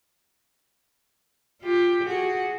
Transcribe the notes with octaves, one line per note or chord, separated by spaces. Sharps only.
F4 G4
F#4 G#4